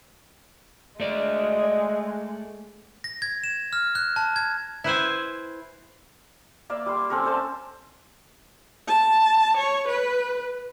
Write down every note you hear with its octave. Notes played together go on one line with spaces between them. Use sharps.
G#3 A3 D5
A#6
G#6
E7
F6
F#6
A5
G#6
E4 B4 C5 G#5
A#3 D5 E5 F5
G3 C6
C4 C#4 A4 A#4
A4 C5 E5 A5
A5
C#5
B4